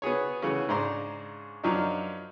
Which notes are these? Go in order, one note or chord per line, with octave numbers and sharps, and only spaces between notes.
B3 F#4 G#4 C#5
C#3 E3 A3 C#4 F#4
G#2 C#3 D4 C5 A#5 C6
F#2 F3 F#3 D4 D#4